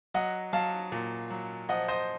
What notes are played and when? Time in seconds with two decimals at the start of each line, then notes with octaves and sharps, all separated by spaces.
0.14 F#3 D#5 F#5
0.53 F#3 F5 A5
0.92 A#2
1.30 F#3
1.69 F3 D#5 F#5
1.88 C5 D#5